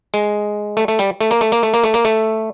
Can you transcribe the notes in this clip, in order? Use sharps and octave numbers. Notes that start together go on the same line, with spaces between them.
G#3
A3
A3
G3
A3
A#3
A3
A#3
A3
A#3
A3
A#3
A3